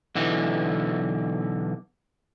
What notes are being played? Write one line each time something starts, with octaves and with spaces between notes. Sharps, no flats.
B1 D3 E3